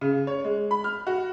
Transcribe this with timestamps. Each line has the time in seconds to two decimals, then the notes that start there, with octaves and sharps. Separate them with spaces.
0.01 C#3
0.27 C#5
0.44 G#3
0.71 B5
0.84 F6
1.07 F#4